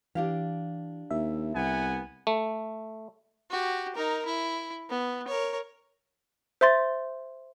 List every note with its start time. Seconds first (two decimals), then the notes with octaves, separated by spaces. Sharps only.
0.15 E3 D4 G4 F5
1.11 D#2 E5
1.55 C2 B3 F#5 G#5
2.27 A3
3.50 F#4 G4
3.95 D#4 A#4
4.26 E4
4.90 B3
5.28 A#4 C#5
6.61 C5 E5 C6 A6